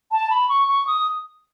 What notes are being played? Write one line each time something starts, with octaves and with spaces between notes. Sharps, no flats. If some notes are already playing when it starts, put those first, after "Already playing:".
A5
B5
C#6
C#6
D#6